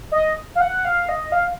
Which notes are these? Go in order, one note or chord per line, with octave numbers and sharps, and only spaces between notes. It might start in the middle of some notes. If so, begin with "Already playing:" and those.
D#5
F5
F#5
F5
D#5
F5